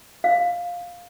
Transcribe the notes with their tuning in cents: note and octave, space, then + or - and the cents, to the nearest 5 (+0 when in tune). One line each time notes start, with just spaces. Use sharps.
F5 +10